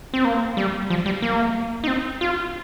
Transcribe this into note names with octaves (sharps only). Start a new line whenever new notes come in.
C4
A#3
G3
F3
G3
A#3
D#4
C4
F4